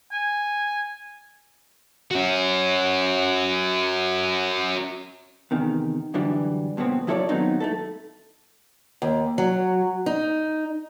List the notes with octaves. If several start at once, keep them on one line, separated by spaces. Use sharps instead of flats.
G#5
C#4 F#4
E2 C3 D#3
F#2 D3 E3 G3
F2 A#2 C#3 B3 C4
F3 F#3 E4 A4 C#5 D5
D#2 F#3 B3 C4 D#4 B4
A3 E4 A4
D#2
F#3
D#4